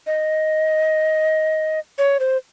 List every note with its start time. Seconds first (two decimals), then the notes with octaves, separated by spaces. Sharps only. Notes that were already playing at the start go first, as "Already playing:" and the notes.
0.07 D#5
1.98 C#5
2.20 C5